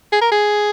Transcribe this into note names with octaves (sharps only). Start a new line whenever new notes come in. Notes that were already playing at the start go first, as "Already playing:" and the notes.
G#4
A#4
G#4